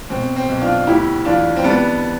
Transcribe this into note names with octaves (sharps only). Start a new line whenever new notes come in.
B2 C4
C4
B1
D4 F4
D2 E4 G4
E3 D4 F4
C4
G3 B3 D4